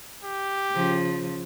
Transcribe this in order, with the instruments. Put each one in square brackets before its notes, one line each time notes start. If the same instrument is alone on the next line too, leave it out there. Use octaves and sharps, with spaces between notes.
[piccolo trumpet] G4
[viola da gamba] C#3 F3